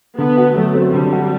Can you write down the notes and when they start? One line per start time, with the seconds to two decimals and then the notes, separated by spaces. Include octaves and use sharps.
0.18 D3 B3
0.37 F#4
0.55 F#3 A3
0.75 C4
0.93 D3 G3
1.13 F#4